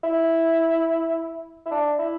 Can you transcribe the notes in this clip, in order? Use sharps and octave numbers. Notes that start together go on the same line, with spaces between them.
E4
E4
D4
E4